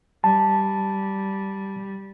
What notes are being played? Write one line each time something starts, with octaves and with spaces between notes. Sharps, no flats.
G3 A5